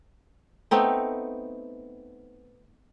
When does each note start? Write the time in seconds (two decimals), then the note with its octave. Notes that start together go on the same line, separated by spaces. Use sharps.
0.71 A3 B3 C4 D#4